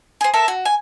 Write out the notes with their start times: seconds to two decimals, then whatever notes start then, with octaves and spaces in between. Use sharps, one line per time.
0.21 G#4 C5
0.34 A4 A#4 E5
0.48 F#4
0.65 G#5